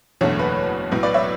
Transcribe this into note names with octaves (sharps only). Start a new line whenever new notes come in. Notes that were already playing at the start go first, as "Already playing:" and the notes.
F#1 E2 B2 A3 D4 C#5
B4
B1 A2 F#3 B3
B4 D5
C#5 E5